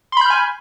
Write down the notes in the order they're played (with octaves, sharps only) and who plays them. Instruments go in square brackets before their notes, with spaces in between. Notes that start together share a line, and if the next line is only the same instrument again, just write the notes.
[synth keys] C6
B5
G6
F6
G#5